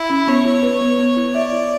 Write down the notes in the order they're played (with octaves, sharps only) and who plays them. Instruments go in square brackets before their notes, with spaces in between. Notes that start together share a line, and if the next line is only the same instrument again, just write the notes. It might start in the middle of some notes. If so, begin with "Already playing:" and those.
Already playing: [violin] E4
[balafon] C#4
[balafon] B3 [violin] C#5
[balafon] E4
B4
B3
B3
E4
[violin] D5 [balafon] E5
[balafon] E4